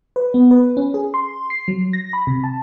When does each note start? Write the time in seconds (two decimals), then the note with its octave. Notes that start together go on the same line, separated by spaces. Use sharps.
0.16 B4
0.34 B3
0.51 B4
0.77 C#4
0.94 G#4
1.14 C6
1.50 C7
1.68 F#3
1.93 A#6
2.13 B5
2.27 C3
2.44 A5